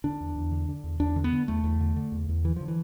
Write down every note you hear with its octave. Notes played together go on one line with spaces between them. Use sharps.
D3 D4
E2
E2
D3
D3
E2
E2 D4
D3
B3
D3
E2 A3
E2
D3
D3
E2
E2
D3 E3
D3 F3
E3